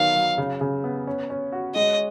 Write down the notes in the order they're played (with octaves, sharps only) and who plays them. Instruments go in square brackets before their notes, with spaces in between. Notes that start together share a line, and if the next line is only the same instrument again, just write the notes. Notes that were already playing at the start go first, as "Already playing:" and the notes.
Already playing: [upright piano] D#3 F#3 B3 [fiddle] F5
[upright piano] F#3
C#3
C#3
B3
C#4
C#4
F#4
[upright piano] G#3 [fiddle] D#5